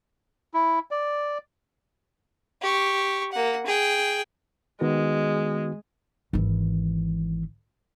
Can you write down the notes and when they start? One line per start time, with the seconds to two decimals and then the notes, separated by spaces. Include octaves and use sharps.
0.54 E4
0.91 D5
2.62 G4 C#6
3.32 A#3 F#5
3.66 G#4 G5
4.81 D#3 G#3 B3 F#4
6.33 G#1 E3